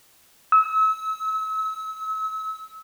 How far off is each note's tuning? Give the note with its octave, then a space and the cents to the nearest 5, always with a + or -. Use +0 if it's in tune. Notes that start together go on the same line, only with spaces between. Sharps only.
E6 -35